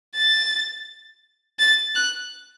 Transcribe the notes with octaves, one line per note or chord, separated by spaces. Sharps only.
A6
A6
F#6